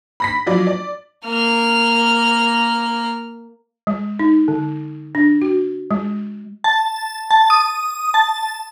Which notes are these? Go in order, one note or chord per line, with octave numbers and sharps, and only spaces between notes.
B5 A#6 B6
F3 F#3 D5
D5
A#3 F6
G#3
D#4
D3
D4
F#4
G#3
A5
A5
D#6
A5